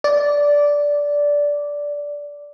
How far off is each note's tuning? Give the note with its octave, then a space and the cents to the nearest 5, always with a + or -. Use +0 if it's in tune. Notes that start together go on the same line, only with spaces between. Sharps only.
D5 -10